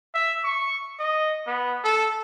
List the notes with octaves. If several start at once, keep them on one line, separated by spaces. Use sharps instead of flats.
E5
C#6
D#5
B3
A4